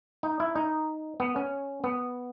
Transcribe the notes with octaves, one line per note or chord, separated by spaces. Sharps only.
D#4
E4
D#4
B3
C#4
B3